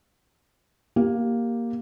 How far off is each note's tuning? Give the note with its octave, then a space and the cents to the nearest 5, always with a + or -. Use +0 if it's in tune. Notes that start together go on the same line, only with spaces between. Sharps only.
A#3 +5 G4 +0